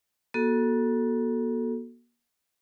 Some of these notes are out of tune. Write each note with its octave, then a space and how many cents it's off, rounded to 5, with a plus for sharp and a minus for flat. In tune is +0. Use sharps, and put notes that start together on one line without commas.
A#3 +45 F#4 +0 A4 +0